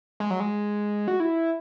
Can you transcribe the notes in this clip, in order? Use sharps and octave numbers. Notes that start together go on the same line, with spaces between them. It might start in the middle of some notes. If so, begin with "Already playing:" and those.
G#3
F#3
G#3
F#4
E4